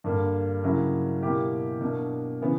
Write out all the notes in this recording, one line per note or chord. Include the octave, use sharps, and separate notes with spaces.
G2 D3 A#3 D4
C#3 F#3 A#3 E4
B2 A#3 E4 G4
B2 A#3 D4
C#3 E3 B3